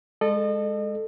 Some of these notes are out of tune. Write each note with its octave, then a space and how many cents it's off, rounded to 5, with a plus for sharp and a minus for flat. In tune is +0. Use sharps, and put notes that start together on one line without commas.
G#3 +0 A4 +0 D#5 -35